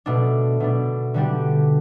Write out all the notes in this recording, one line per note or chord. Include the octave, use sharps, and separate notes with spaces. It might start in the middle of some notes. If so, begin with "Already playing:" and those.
B2 A3 D4
B2 A3 D4
D3 G3 D4 G4